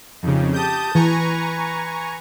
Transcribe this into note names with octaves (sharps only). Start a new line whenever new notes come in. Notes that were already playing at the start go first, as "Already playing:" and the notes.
F2 C#3 D#4 G4
G4 A5 D#6 G6
E3 B4 G#5 A#5 C#6